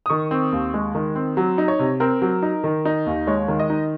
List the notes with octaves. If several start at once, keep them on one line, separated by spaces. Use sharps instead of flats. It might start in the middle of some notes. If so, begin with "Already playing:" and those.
D#6
D#3 C#6
C4
D#2
G#3
D#3
C4
F#3
D#4
C#5
C3
C4 A#4
F#3
D#4
D#3
D#4
D#2
G#3 C#5
D#3
D#5
D#4